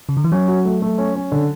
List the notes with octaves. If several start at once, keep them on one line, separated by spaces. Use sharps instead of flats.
C#3
D3
E3
F#3 C#4
F#4
A3
A3
C#4
C#4
D3